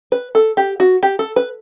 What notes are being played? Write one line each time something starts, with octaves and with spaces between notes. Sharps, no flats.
B4
A4
G4
F#4
G4
A4
B4